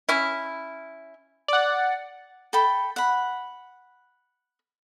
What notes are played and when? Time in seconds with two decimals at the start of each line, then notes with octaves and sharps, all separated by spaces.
0.09 C#4 E4
1.48 D5 F#5
2.53 A4 G5 B5
2.96 F#5 B5